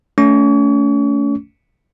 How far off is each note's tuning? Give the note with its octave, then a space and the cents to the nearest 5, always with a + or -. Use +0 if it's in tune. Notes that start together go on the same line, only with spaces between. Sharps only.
A3 +0 C#4 +35 C#6 +40